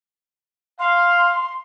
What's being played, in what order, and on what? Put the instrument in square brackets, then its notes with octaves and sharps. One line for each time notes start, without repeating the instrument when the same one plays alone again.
[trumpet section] F5 [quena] C6